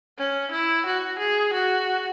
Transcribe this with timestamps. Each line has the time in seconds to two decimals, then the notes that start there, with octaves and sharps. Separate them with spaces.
0.18 C#4
0.52 E4
0.86 F#4
1.19 G#4
1.54 F#4